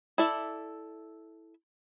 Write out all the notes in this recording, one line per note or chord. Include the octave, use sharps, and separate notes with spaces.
E4 A4 D5 E5